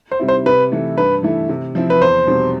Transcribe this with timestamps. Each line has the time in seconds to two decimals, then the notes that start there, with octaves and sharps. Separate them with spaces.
0.12 C5
0.19 C3 G3 C4 E4
0.28 C5
0.46 C3 B4
0.72 E3 A3 E4
0.97 G2 B4
1.23 E3 A3 E4
1.49 C3
1.75 F3 C4 E4
1.90 B4
2.01 E2 C5
2.27 B2 G3 C4